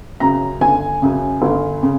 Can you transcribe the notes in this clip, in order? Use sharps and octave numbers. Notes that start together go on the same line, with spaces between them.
F#2 C#3 A#5
G1 G#5
F#2 C#3
G1
C#3